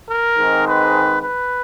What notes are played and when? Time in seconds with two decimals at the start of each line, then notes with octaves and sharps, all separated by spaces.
0.09 A#4
0.37 G#2 D#3 G#3 C4
0.66 B4
1.22 B4